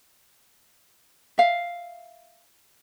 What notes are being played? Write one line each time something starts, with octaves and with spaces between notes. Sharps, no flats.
E5 F5